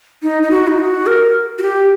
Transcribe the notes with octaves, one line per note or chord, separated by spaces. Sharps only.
D#4
D#4
F#4
D#4
F#4
A#4
F#4
G4